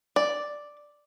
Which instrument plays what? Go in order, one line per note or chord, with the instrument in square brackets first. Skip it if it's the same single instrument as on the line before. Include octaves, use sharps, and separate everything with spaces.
[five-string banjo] D5